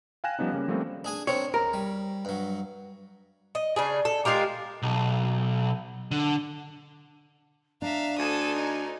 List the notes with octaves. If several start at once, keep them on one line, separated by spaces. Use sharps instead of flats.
F5 G5 G#5 F#6 A#6 E7
F3 G3 B3 C#4 D#4
C#3 G3 A#3 C#4
F3 G3 A3 A#3 C4 C#4
D4 G#4 G#5
C4 D4 A#4 C#5
C#2 A#4
G3
G2 F#3
D#5
C#3 D4 G#4
A4
G#3 F4 G4 A#4
B1
D3
D4 E5 F5 A#5
D2 A4 G#5 D#6
D#4